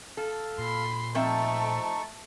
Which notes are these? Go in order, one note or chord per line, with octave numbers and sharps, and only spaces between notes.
A4 F5 A5
A#2 B5 C6
F3 A3 C4 D#4 A4 E5 A5 C#6